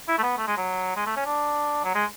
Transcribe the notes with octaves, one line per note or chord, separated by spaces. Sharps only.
E4
A3
B3
A3
G#3
F#3
G#3
A3
C#4
D4
F#3
G#3